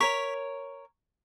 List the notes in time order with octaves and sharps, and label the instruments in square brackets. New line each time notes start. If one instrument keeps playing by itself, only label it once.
[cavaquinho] A#4 C#5 [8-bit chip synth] C#6 B6